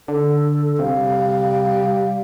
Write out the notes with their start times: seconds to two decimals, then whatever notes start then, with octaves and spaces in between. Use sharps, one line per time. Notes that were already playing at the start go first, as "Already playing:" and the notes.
0.08 D3 A4
0.79 C3 G3 F5